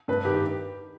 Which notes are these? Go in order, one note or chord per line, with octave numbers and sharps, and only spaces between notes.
G2 B4
D#3 G4
G4